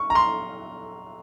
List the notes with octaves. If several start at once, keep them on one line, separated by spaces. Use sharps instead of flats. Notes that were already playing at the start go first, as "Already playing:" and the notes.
Already playing: C#6
A#5
C6